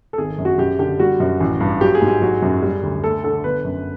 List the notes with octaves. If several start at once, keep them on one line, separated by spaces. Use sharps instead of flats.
A4
G#1 G#4
F#2
F#4
F#2 G4
D3 G4
G3 F#4
F#2
A1
G2
F#3 G4
G#4
G#2
G#4
F#3
F#2
G3
D2
A3 A4
D3 A4
G1 B4
F#2